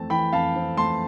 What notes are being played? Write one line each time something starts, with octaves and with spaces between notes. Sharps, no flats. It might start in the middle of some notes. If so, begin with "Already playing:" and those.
Already playing: F2 E3 A3 C4 A5
E3 G5 B5
F2 F5 A5
C4
A3 A5 C6